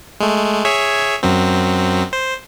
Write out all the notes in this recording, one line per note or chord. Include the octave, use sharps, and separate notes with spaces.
G#3 A3
G#4 C#5 E5
F#2 F#3 C4
C5